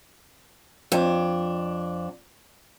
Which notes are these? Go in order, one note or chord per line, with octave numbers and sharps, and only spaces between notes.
F2 D4